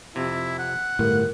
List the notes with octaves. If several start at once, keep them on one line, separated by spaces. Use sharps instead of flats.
F2 C3 E4
F#5
G1 A2 A#4